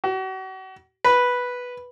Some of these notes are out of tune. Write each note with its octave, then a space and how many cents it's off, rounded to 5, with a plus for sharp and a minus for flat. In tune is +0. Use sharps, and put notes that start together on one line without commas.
F#4 +40
B4 -5